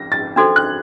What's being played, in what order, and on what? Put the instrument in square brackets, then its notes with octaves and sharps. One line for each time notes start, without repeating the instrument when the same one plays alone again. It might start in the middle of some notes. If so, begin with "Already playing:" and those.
Already playing: [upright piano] A#6
A6
[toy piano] D4 F#4 A4 C5 [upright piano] G#6
[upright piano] F#6